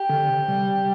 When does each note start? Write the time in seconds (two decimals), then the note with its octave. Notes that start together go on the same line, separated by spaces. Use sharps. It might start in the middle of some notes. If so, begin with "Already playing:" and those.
Already playing: G4
0.09 D3
0.29 C3
0.48 G3